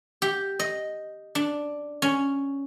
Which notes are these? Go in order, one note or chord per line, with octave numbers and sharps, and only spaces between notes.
G4
D#5
D4
C#4